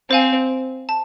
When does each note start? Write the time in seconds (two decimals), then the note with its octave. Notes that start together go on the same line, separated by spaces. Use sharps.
0.10 C4 C5 F5 G#5
0.89 A5